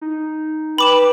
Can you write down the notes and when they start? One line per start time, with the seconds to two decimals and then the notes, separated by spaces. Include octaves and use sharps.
0.01 D#4
0.78 B4 G5 B5 D6 E7